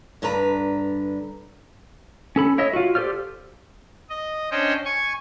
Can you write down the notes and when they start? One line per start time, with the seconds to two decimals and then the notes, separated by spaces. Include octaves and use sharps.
0.22 G2 D3 D4 B4 A#5
2.36 C#4 A4 B5
2.58 E4 C#5 D#5 E5
2.73 F4 F#4
2.95 G4 A4 C5 D5 F6
4.09 D#5
4.51 C#4 D4 C5 C#5 D#5 G5
4.85 G#5 C#6